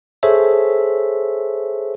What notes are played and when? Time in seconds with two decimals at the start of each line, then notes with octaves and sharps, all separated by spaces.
0.23 G#4 A4 C5 C#5 E5